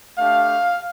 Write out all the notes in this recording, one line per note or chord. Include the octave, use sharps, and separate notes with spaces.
A3 D4 G4 F5